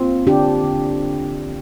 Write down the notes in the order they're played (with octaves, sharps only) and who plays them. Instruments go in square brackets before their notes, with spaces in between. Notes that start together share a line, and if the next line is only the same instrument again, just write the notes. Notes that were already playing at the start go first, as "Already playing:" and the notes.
Already playing: [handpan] A#3 C4 F4
D3 D4 G4
D3